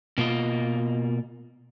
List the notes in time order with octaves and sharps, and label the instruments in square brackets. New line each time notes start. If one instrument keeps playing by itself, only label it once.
[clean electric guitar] B2 A#3 F4 D#5